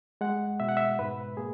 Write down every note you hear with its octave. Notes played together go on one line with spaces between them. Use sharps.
G#3 F#5
B2 E5
F#5
E5
G#2 B4
A#3 G#4